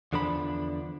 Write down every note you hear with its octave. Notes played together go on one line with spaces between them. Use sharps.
E2 D3 F3 D4 B5